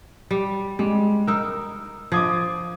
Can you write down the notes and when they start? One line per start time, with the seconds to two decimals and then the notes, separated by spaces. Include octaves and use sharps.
0.31 G3
0.79 G3 G#3
1.27 D#4 A#4 E6
2.12 F3 D6 D#6 G#6